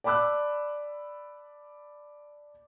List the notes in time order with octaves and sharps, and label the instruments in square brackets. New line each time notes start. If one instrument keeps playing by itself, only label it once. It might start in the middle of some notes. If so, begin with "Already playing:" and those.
[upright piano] D5 A5 B5 D6 E6 F#6